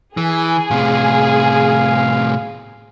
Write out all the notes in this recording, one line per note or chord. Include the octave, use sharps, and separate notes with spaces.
E3 G#4
A2 C3 F5